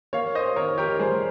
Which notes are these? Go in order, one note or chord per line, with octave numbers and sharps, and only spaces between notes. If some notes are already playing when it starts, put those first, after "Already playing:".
A#3 C#5 F5
C5 D#5
D#3 A#4 C#5
G4 A#4
G3 G#4 C5